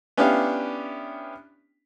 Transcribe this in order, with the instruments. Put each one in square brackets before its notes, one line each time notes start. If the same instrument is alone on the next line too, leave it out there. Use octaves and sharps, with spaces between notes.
[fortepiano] B3 C#4 D4 E4 G4 F5